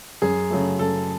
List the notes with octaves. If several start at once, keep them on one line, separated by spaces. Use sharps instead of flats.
F#2 G#4
C#3 F#3 A3
F#2 A4